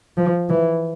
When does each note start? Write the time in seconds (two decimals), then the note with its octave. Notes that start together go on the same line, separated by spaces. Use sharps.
0.18 F3
0.50 E3